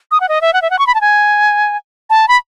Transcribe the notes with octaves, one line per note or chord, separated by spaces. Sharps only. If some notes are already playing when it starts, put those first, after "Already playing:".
D#6
F#5
D#5
E5
F#5
E5
F#5
C#6
B5
A5
G#5
A5
B5